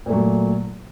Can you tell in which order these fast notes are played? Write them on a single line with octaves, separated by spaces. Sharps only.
A#2 A3 F#3